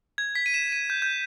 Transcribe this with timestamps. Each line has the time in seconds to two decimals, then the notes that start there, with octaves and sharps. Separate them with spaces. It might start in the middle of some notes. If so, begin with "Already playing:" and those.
0.18 G#6
0.35 B6
0.46 D#7
0.54 E7
0.72 D#7
0.90 G6
1.02 G6